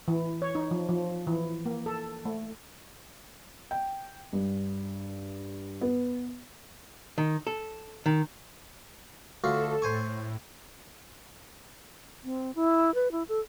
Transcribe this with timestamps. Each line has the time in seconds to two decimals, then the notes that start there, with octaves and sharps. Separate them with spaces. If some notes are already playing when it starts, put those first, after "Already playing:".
0.08 E3
0.42 C#5
0.55 D#4
0.71 F3
0.89 F3
1.27 E3
1.66 A#3
1.86 A4
2.25 A3
3.71 G5
4.33 G2
5.81 B3
7.18 D#3
7.47 A4
8.06 D#3
9.44 D2 F4 F#4 A4
9.82 A2 C5 G#5 C#6
12.24 C4
12.55 E4
12.95 B4
13.12 E4
13.29 A4